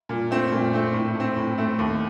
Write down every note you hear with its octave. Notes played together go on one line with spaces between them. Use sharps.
A#2
A3 C4
A#2
A3 C4
A2
A3 C4
A2
A3 C4
D#2